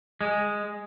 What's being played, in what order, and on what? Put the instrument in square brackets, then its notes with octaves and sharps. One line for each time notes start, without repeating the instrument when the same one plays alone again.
[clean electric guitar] G#3